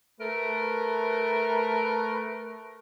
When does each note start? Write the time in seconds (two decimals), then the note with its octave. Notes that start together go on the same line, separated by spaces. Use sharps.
0.20 A3 A#4 B4